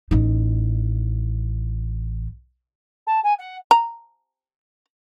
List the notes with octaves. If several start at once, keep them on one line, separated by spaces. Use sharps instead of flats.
A1 D#4
A5
G#5
F#5
A#5